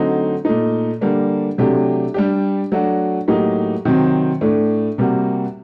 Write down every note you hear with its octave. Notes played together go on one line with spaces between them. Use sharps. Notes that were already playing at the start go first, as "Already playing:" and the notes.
Already playing: D3 F#3 A3 C4 D#4
A#2 A3 D#4
D3 G3 A#3 D4
C3 F#3 A3 D4 G4
G3 D4 G4
F#3 A3 D4 F#4
A2 F#3 A#3 D#4 G4
C3 D#3 F#3 C4
A2 A3 D4
C3 G3 A#3 F#4